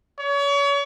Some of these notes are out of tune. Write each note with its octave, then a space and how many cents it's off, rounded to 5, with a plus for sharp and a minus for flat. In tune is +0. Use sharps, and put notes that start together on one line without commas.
C#5 +35